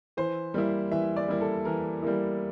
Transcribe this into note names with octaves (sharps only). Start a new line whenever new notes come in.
E3 C5
G3 A#3 E4
E3 E5
D5
G3 A#3 E4
A4
E3 A#4
G3 A#3 E4